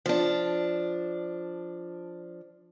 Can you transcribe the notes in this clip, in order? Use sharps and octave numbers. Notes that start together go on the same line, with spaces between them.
F3 D4